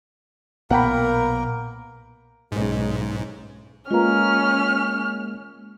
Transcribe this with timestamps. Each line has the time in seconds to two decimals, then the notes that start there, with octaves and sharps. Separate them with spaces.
0.70 B1 A#2 A#3 B3 A#4 F#5 G5 B5
2.52 B1 G#2 G#3 C#4
3.91 G#3 A#3 C#4 F4 B4 A#5 F6